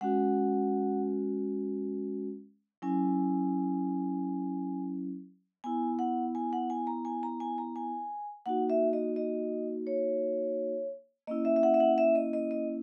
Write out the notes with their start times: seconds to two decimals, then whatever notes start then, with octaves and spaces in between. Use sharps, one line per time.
0.01 G#3 C#4 F#4 F#5
2.82 F#3 C#4 E4 G#5
5.64 B3 E4 G#5
5.99 F#5
6.35 G#5
6.53 F#5
6.70 G#5
6.87 A#5
7.05 G#5
7.23 A#5
7.40 G#5
7.58 A#5
7.76 G#5
8.46 A#3 D#4 F#4 F#5
8.70 E5
8.93 D#5
9.16 D#5
9.87 C#5
11.27 A#3 C#4 E4 D#5
11.45 E5
11.56 E5
11.63 F#5
11.74 E5
11.80 F#5
11.98 E5
12.15 D#5
12.33 D#5
12.51 D#5